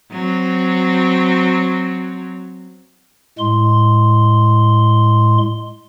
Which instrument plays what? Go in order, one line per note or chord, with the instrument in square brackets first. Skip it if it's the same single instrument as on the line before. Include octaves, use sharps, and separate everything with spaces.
[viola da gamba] F#3 C4
[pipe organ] A2 G#3 C6